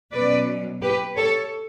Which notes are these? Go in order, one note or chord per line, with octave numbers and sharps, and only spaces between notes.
B2 F#3 C#4 B4 D5
G4 B4
A4 C#5